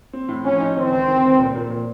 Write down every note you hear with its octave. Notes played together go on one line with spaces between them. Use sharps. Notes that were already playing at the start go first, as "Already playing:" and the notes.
C4
A2
F3 C#4
D#4
D#3 C4
C#2
D#3
C#2
A#2
A#2
A#2